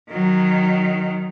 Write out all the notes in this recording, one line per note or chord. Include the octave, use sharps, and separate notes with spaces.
D#3 F#3